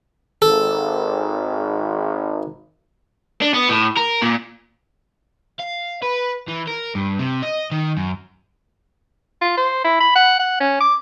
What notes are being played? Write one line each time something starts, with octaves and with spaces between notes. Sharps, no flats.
G#1 A4
D4
B3
A2
A#4
A#2
F5
B4
E3
A#4
G2
C3
D#5
D#3
F#2
F4
C5
E4
B5
F#5
F#5
C#4
D6